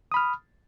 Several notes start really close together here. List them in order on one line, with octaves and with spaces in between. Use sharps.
D#6 B5 F6